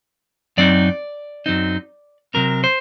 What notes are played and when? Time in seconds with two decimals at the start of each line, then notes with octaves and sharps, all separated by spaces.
0.57 F#2 F#3 C4 D#4 D5
1.46 F#2 F#3 C4 D#4
2.34 C3 F#3 C4 A#4
2.64 C5